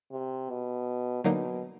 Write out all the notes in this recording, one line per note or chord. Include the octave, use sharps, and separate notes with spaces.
C3
B2
B2 D3 F#3 A#3 D#4